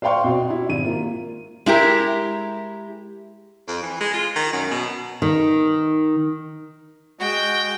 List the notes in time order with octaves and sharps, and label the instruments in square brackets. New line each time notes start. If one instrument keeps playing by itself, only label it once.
[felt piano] C5 D5 F5 G5 C6 C#6
B2 C4 F#4
E4 G4
G#1 D#7
A#3 F4
[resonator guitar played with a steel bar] G#3 E4 G4 A#4
[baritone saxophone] F2
E3
G#3
F4
D#3
F#2
B2
[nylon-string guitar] D#3
[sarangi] G#3 [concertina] F#4 [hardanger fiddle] G5